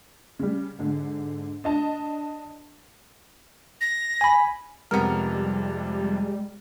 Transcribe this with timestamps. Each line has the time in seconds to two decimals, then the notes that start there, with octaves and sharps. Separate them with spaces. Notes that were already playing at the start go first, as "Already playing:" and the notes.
0.39 C#3 G3
0.79 G#2 D3
1.64 D4 D#5 A5
3.81 A#6
4.21 G#5 B5
4.91 F2 C3 G3 G#3 B3 A#4 F6